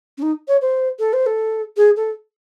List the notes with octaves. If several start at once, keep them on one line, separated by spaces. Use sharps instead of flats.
C#4
D#4
C#5
C5
A4
C5
A4
G#4
A4